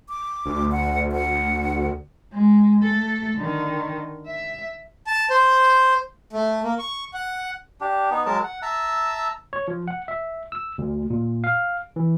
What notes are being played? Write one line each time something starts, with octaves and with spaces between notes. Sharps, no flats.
D6
D2
F#5
F#5
G#3
A3 A4
D3 D#3
E5
A5
C5
A3
A#3
C#6
F#5
D4 G4
B3 D#4
F#3 G#3 A#4 A5
F#5
E5 A5 A#5 E6
C#5
F3
F#5
E5
E6
D2
A#2
F5
E3